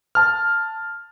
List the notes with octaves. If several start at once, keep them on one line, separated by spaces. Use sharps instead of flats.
A5 F6